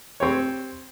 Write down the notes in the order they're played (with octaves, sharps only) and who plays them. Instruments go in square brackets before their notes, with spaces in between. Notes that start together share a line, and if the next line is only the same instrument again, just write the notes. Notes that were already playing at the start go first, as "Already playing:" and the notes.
[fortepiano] C4 G4 C#5